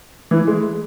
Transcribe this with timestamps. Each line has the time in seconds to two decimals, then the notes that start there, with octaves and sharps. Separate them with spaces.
0.31 E3
0.47 G#3